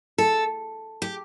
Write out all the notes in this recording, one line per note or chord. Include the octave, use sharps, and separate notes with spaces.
A4
G4